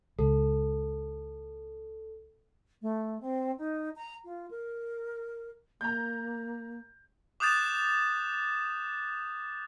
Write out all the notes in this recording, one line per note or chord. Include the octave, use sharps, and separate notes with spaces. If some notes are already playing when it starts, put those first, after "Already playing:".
C#2 A4
A3
C4
D#4
A#5
F4
A#4
A#3 A#5 G6
D6 D#6 F#6 G6 A6 E7